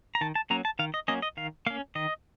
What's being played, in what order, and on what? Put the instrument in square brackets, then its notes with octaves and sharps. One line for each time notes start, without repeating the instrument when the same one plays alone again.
[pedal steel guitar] A#5
D#3 A5
A5
F#3 A#3 C#4 A#5
A5
D#3 F5
D#5
F#3 A#3 C#4 D#5
D#5
D#3 F5
A#3 F5
C#4
D#3 D#5